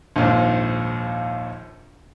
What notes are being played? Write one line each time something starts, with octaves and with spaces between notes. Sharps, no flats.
A#1 D#2 G#2